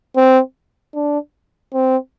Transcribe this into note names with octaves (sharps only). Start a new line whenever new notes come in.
C4
D4
C4